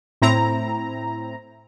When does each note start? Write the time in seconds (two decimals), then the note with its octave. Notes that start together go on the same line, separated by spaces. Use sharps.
0.22 A2 C4 E4 A#5